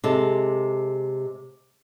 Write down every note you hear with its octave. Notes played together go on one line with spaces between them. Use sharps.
C3 G#3 A4